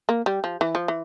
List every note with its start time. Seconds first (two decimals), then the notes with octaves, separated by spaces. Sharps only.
0.09 A#3
0.26 G3
0.44 F3
0.61 E3
0.75 F3
0.88 E3